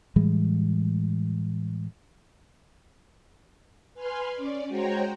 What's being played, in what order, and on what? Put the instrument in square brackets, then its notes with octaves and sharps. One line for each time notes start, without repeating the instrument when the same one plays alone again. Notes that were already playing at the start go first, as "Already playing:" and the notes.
[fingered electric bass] A2 E3 G3 G#3
[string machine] B4 G#5 C6 F6
C#4 D5
G#3 F#4 C5 C#5 G5 A#5